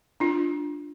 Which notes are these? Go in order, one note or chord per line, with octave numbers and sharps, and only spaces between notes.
D4 F4